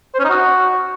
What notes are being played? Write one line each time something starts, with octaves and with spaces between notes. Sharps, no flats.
C5
C#4
D#4
F#4